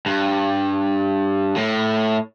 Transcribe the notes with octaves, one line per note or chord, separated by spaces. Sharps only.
G2
A2